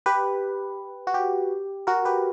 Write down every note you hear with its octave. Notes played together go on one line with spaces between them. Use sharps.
G4 B4
F#4
G4
F#4 A#4
G4 B4